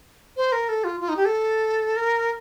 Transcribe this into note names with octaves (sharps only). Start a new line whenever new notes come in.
C5
A#4
A4
F4
F4
D#4
G4
A4
A#4